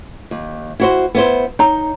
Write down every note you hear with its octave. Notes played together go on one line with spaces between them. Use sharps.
D#2
E4 F#4 C5
B3 E4 B4 C5
D#4 C#5 A#5